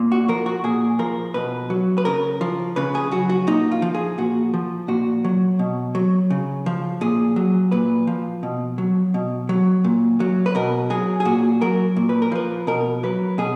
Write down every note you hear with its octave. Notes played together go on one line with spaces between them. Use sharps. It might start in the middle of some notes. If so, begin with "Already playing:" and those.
Already playing: A#2
F#4
F3 A#4
F#4
A#2 G#4
F3 A#4
B2 B4
F#3
B4
C#3 A#4
F3
C#3 B4
G#4
F#3 F#4
F#4
A#2 D#4
F4
F3
G#4
A#2 F#4
F3
A#2 F#4
F#3
B2
F#3
C#3
F3
A#2 G#4
F#3
A#2 B4
F3
B2
F#3
B2
F#3
A#2
F#3
B4
B2 A#4
F#3 G#4
G#4
A#2 F#4
F#3 A#4
A#2
B4
A#4
F3 B4
B2 A#4
F#3 B4
B2 G#4